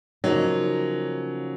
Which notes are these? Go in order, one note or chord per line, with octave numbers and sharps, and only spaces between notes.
C#3 F3 F#3 A#3 D#4